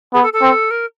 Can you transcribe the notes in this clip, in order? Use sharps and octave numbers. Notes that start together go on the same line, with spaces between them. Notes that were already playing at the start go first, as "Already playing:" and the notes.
B3 G#4
A4
A4
C4
A#4